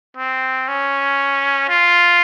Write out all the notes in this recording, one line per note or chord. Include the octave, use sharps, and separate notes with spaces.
C4
C#4
F4